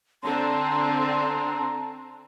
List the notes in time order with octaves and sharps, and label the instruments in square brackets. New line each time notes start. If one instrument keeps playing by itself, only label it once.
[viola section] D3 C4 [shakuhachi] A5 [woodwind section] A#5 C6